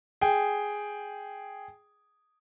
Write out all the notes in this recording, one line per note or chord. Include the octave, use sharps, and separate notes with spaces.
G#4 G5